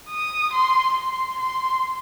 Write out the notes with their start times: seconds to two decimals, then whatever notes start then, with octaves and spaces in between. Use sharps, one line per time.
0.09 D#6
0.53 C6
0.96 C6
1.39 C6